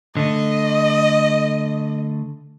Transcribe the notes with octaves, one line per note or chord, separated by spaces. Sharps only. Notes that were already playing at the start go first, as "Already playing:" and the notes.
D3 A3 D#5